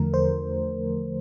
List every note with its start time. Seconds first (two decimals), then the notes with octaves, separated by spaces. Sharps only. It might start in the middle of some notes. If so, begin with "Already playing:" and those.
Already playing: E2 D3 F3 A3 A#4
0.14 C5